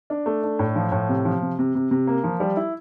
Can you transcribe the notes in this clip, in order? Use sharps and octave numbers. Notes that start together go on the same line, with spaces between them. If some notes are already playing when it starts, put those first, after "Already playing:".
D4
A3
D4
A2
F3
A2
C3
F3
C3
C3
C3
C3
A#3
F3
G3
E4